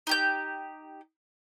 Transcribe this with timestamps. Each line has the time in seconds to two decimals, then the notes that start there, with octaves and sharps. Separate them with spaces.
0.07 D#4 G4 G6